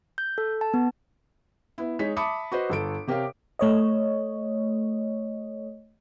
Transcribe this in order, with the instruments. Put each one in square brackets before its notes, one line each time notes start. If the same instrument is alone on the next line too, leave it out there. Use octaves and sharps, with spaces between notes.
[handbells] G6
A4
A5
B3
[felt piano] B3 E4
G#3 D#4 C#5 B6
E5 A5 B5 D6 D#6 C#7
F#4 B4 C5 D#5
G1 A4 D7
C3 G4 A#4 C#5 F5
[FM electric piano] A3 C#5 D#5